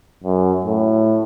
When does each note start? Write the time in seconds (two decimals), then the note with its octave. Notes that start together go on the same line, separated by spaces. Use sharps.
0.23 F#2
0.65 A2